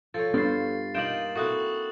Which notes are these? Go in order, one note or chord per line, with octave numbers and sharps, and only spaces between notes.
F3 A4 C#5 A6
G2 B3 F4 C5 A6 C7
A#3 D#4 F4 D#5 G5 E7 F#7
C4 E4 F#4 A4 C#6 D#6 F#6